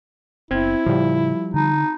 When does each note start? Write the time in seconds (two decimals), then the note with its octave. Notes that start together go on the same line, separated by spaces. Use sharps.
0.51 F#1 B3 C4 E4 G#6
0.86 A2 C#3 F3 G3
1.54 D3 D#4